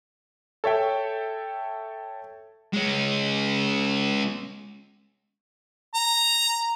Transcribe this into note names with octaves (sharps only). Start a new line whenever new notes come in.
A4 C#5 E5 G5
G#3 C#4
A#5